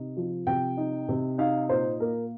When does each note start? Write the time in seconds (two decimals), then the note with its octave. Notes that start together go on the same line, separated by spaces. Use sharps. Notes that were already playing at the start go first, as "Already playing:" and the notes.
Already playing: C3 D#4
0.17 F3
0.47 C3 G5
0.77 D#4
1.09 C3
1.38 D#4 F5
1.69 A#2 C5
2.00 A#3 A#4